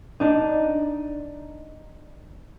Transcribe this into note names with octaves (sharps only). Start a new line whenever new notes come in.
D4 D#4